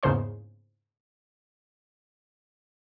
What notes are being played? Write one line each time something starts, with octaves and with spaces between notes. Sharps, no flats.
E2 G#2 C#3 A#3 C5 C6